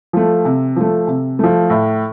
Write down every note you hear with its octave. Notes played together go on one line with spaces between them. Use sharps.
F3 A3
C3
F3 A3
C3
F3 A3
A2